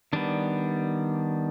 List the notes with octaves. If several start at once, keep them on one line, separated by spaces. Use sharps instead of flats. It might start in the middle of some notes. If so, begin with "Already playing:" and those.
D#3 G3 B3 D4